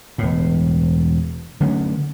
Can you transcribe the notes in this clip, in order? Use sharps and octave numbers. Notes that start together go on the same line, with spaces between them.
E1 A2
D3 F#3 A3 C#4